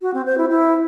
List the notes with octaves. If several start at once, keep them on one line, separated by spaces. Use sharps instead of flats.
F#4
C4
C5
E4
E4